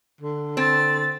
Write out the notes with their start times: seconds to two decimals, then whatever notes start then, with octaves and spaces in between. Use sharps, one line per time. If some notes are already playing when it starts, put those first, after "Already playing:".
0.21 D3
0.57 C4 A6